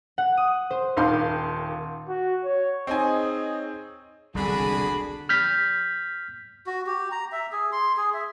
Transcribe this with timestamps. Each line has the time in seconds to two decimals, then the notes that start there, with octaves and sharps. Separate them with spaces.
0.18 F#5
0.37 D#6
0.71 C5
0.97 D#1 D#2 F5 C6 G6
2.08 F#4
2.44 C#5
2.87 C4 D#4 G#4 C#5 D#5 G#5
4.35 E1 C2 D3 G3 D4 F#4 G#4 B5
5.29 F6 G6 B6
6.67 F#4
6.87 G4
7.12 A#5
7.32 E5
7.52 G#4
7.72 C6
7.97 G#4
8.14 E5